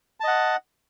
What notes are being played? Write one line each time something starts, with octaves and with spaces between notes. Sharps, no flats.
D#5 F#5 A5